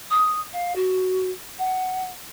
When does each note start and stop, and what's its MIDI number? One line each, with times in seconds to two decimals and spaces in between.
0.10 0.40 87
0.53 0.73 77
0.75 1.30 66
1.58 2.06 78